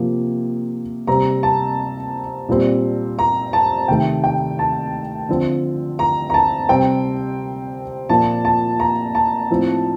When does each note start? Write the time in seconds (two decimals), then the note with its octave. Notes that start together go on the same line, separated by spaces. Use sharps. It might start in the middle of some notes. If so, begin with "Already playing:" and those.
Already playing: C3 F3 A#3
1.07 C3 G3 C4 A#5
1.43 A5
2.49 A#2 G3 C4
3.19 A#5
3.53 A5
3.88 C3 D#3 A3 G5
4.24 G5
4.59 A5
5.29 D3 F3 C4
5.99 A#5
6.30 A#5
6.34 A5
6.69 C3 G3 C4 G5
8.09 A#2 F3 A#3 A5
8.45 A5
8.80 A#5
9.15 A5
9.50 A2 F3 C4